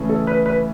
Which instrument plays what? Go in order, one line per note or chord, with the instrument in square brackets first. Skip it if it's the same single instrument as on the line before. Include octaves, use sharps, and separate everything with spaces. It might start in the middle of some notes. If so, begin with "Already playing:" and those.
Already playing: [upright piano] C#3 E3 A3
[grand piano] A4
B4
B4